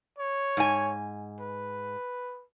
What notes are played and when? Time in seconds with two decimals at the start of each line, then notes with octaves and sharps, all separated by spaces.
0.18 C#5
0.57 G#2 G#5
1.41 B4